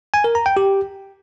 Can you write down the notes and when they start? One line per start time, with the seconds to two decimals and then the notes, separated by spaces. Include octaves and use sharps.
0.14 G#5
0.24 A#4
0.35 A#5
0.46 G5
0.57 G4